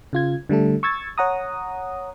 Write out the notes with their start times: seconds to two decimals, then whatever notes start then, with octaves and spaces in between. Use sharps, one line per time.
0.13 C#3 F4 G#6
0.49 D3 G3 A3 A4
0.83 C#6 E6 G#6 A6
1.18 C#5 F#5 A#5 D#6